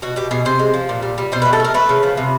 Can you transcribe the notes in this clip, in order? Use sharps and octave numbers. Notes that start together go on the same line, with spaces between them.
B2 F#4
B2 G4
B2 G#4
C3 C5
G#3
F3
A#2
G3
G3
B2 C5
B4
A3
A4
A3 A#4
A3 B4
C#3
F3
C3